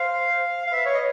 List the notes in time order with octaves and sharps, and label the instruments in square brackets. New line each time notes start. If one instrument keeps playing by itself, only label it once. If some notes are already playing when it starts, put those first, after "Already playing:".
Already playing: [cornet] C5 [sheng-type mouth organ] F5
[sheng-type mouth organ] F5
[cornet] B4 [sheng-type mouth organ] E5
[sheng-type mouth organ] C#5
D#5